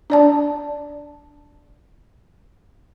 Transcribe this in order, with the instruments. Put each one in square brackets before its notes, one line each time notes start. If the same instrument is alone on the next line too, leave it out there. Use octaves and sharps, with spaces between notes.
[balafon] D4 D5 A5